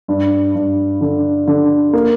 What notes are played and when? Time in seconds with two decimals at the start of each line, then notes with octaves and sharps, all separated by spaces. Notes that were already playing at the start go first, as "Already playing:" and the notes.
0.08 G2
0.55 G2
1.01 D3
1.48 D3
1.93 A#3